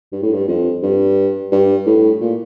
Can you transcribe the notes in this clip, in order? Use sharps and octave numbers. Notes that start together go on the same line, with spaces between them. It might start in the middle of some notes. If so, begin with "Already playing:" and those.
G2
A2
G2
F2
G2
G2
A2
A#2